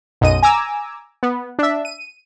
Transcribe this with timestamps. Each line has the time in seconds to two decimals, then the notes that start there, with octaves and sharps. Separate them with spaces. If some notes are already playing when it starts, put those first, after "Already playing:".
0.21 B1 F#2 D#5 D#7
0.43 G#5 A#5 D6 E6
1.23 B3
1.59 D4 E5
1.85 D#7